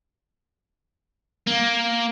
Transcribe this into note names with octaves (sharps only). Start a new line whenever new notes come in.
A#3